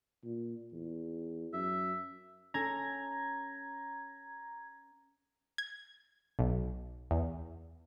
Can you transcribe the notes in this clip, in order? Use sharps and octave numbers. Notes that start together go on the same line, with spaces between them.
A#2
E2
F#2 E5
C#4 A4 A#5 G#6
G#6
B1
E2